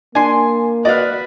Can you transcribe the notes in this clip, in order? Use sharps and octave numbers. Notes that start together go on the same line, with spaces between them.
A#3 D4 G#5 C6
F#4 B4 D5 D#5 F5